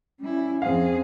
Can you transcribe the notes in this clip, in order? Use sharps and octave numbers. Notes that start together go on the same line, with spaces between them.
G3 C#4 E4
F2 C4 G#4 F5